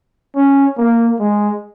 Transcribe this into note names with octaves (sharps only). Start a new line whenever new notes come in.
C#4
A#3
G#3